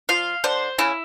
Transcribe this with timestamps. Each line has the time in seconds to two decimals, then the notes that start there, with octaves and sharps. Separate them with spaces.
0.09 F3 F4 F5
0.44 D3 D4 C5
0.78 C#3 C#4 E4